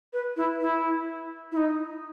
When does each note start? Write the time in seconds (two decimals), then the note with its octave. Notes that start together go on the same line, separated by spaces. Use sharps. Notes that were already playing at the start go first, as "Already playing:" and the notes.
0.13 B4
0.37 E4
0.61 E4
1.52 E4
1.57 D#4